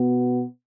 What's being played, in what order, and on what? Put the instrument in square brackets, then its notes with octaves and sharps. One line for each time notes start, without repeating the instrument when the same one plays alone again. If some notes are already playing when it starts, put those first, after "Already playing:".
Already playing: [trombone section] B2 B3